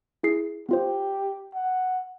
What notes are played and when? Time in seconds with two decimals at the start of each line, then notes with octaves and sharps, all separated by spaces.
0.23 E4 G#4 C7
0.69 B3 F4 G4 C5
1.55 F#5